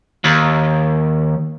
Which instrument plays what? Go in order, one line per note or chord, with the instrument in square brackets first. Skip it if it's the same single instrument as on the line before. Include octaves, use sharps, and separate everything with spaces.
[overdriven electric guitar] D#2